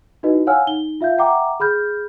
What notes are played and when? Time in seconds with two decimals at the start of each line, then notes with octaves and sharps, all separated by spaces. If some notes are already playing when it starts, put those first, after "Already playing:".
0.23 D#4 E4 F#4 B4 D#5
0.47 C#5 F5 F#5 G#5 E6 F6
0.67 D#4 G7
1.01 F4 E5 F5 G6
1.18 E5 F#5 G5 A#5 D6
1.60 G#4 B5 F6 G6